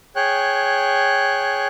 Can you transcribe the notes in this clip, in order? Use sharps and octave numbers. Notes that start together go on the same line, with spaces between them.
G#4 C#5 G5 F#6